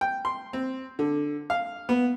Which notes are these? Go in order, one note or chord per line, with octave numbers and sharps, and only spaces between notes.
G5
C6
C4
D3
F5
B3